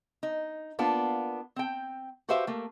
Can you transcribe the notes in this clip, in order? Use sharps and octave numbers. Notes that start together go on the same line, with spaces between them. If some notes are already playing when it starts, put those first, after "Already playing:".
D#4
A#3 B3 D4 F4
C4 G5
F#4 G4 B4 C5 E5 F5
A3 A#3